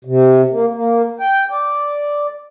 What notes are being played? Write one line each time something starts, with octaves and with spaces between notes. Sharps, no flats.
C3
A#3
A#3
G5
D5